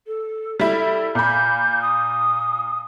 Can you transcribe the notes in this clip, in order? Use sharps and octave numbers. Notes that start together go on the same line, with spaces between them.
A4
G3 E4 A4
A#2 B5 G6
D#6